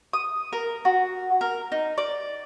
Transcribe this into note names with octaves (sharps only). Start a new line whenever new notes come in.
D#6
A#4
F#4
A#4
D#4
D5